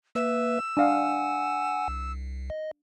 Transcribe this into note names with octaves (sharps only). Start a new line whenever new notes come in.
A#3 B4 E5 E6
D4 F5 F#5 G#5 D#6
C2
D#5